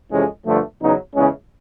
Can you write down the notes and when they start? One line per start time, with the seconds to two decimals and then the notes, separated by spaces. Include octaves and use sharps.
0.11 F2 C3 E3 G#3 C#4
0.46 G2 D3 F3 A3
0.81 E2 C#3 F#3 B3 D#4
1.15 E2 C#3 E3 G#3 C#4